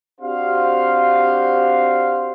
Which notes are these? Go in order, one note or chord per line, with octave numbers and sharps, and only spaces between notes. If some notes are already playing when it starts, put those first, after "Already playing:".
C4 D4 F#4 G4 C5 F5